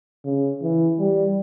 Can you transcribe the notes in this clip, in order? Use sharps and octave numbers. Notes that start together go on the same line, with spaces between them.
C#3
E3
G3